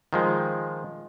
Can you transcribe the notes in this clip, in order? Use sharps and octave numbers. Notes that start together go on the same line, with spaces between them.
D#3 F3 G#3